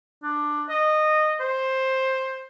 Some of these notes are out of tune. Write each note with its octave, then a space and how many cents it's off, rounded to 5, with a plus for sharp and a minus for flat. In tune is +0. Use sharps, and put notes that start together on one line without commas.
D4 +10
D#5 -15
C5 +10